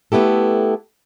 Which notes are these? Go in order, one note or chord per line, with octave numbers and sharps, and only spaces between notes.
A3 B3 E4 G4 A4